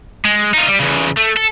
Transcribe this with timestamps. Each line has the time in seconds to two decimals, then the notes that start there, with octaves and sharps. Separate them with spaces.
0.25 G#3
0.54 D#4 F4
0.67 G3
0.80 E2 C#3
1.17 A3
1.37 A4